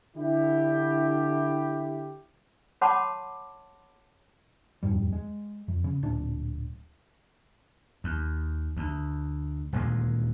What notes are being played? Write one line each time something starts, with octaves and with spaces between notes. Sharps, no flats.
D3 E4 G4
C#5 F#5 A5 B5 C6 D6
D#1 F2 G#2 G3
G#3
F2
C#3
D1 A#2 D4
D#2
D2
D#1 D2 A#2 G#3